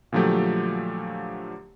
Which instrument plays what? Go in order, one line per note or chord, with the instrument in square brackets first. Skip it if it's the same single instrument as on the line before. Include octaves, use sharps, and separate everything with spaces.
[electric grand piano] A#2 D3 F3 F#3 A3 G4